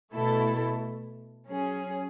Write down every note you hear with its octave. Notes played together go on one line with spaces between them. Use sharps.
B2 A3 E4 A4
F#3 C#4 G#4